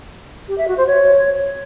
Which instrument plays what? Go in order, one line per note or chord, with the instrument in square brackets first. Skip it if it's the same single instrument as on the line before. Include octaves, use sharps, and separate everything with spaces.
[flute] G4
E5
F#4
C5
C#5